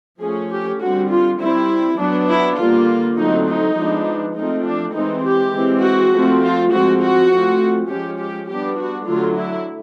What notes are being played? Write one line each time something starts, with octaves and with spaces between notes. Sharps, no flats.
F3 A3 C#4 G#4
G4
D3 G3 C4 F#4
F4
G3 C4 E4
F#3 B3 D4
E4
D3 G3 A#3 F4
D3 F#3 A3 C4 D#4
D#4
F3 G#3 B3 D4
F3 A3 C4 D#4
D4
E3 G#3 C4 D#4
G4
E3 G#3 C4
F#4
F3 A3 C4
F4
F3 G#3 C4 F#4
F#4
F3 A3 C4
F3 G#3 C#4 G4
G4
G3 B3 D4 G4
F#4
D3 F#3 A3 F4
E4